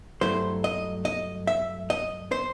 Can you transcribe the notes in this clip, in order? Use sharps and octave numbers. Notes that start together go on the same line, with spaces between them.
G2 F#3 A3 E4 C5
D#5
D#5
E5
D#5
C5